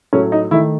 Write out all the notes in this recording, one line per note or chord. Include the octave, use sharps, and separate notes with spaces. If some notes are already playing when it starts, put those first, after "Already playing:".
A2 F#3 A3 C#4
D#4
D#3 A3 E4